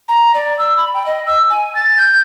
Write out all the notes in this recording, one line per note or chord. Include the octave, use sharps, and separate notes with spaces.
A#5
D5
E6
B5
G5
D#5
E6
G#5
A6
G6